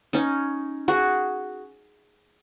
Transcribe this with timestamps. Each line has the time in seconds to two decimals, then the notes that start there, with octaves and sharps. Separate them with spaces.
0.13 C#4 D#4
0.88 F#4 G#4